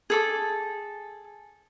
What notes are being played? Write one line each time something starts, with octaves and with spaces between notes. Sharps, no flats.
G#4 A4 D6